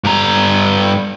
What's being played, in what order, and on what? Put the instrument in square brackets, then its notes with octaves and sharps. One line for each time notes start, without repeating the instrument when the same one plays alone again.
[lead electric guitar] G2 A#5